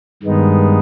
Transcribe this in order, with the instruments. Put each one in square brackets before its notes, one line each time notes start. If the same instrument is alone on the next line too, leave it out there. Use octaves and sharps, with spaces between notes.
[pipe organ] G2 D#3 G#3 B3 D#4